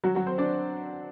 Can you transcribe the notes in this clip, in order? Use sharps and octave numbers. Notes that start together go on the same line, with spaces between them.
F#3 F#4
F#3 F#4
C4 C5
D4 D5